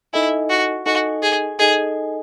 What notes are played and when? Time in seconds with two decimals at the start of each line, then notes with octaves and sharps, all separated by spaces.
0.13 D#4 E4 A4 D#5 G#5
0.50 F#4
0.86 D#4 F#4 A4 D#5 G#5
1.23 G#4
1.59 D#4 G#4 A4 D#5 G#5